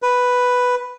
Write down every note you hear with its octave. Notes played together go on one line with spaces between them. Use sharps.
B4